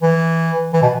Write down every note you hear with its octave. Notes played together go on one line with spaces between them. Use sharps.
E3
E3
B2